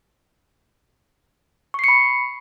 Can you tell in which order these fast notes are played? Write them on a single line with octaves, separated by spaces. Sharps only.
C#6 C7 C#7 B5